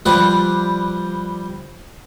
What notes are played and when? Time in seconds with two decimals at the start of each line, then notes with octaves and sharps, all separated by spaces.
0.06 F3 G3 B4 D5